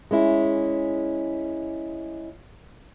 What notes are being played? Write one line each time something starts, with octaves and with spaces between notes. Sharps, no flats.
G#3 C#4 E4